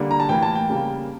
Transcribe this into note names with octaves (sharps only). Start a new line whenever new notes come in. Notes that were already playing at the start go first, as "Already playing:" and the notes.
Already playing: D3 G3 A#3
A#5
A5
A2 E3 A#3 G5
A5
G5
C#3 G3 A#3